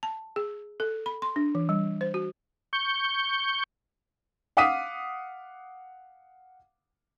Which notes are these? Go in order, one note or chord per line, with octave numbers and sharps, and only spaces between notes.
A5
G#4
A4
B5
C6
D4
E3
G3
C5
F#4
C#6 G6
F5 F#5 D6 D#6 B6 D#7